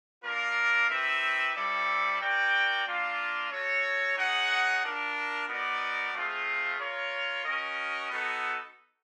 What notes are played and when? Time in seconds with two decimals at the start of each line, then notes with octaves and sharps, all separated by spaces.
0.24 A#3 D4 F4 A#4
0.89 C4 D#4 G4 B4 E5
1.55 G3 C4 E4 A4 D5
2.20 F#4 A#4 D5 G5
2.86 A#3 D4 F4
3.52 F#4 A4 C#5
4.17 D#4 G#4 C#5 F#5
4.83 D4 F4 A#4
5.48 B3 D#4 F#4 A#4 D5
6.13 A3 C4 F4 G#4
6.79 F4 A#4 C#5
7.45 C#4 F#4 A#4 D#5
8.10 B3 D#4 F#4 A4